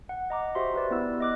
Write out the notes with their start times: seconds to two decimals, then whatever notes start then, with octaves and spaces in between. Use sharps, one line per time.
0.09 F#5
0.30 D#5 A#5 D6
0.55 F#4 G4 C5 E5 C6
0.74 G4 B4 D5
0.91 B3 E4 E6
1.20 D#5 D6 F#6